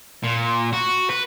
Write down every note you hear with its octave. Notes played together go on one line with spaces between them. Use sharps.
A#2
F#4
B4